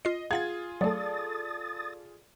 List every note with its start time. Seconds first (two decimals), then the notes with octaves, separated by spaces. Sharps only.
0.05 F4 D#5 C7
0.31 F4 G#4 F5 F#5 G#6 A6
0.81 F#3 A3 A4 D5 D#6 A6